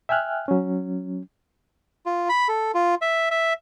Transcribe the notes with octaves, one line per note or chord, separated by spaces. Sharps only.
E5 G5 G#5 F6 F#6
F#3 C#4
F4
B5
A4
F4
E5
E5